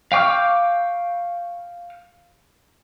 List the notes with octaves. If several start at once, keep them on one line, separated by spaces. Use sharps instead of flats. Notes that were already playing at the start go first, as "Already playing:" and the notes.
F5 G5 C#6 D6 F6